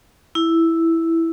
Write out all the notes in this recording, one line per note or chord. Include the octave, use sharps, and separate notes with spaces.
E4